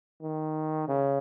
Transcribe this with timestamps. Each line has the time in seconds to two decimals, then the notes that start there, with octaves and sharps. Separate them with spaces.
0.23 D#3
0.88 C#3